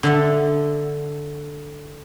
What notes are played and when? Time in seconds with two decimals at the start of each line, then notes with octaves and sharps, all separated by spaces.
0.03 D3 A4 E5